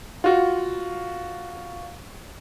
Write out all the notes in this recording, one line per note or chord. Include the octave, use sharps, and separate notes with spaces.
F4 F#4